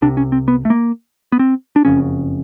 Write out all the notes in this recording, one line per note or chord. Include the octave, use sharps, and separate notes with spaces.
C2 C3 D4
C#4
C4
B3
A3
A#3
B3
C4
D4
F#1 F2 C#3 C#4